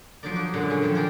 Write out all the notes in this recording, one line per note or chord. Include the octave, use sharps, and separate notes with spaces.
F3 F#3 A#3 D#4 A#4 D5
F#4
F#2 A#2 D3 F#3 G#3
C#3 C#4
D#3 F3 F#3
F#4 G#4 A#4 D5 G5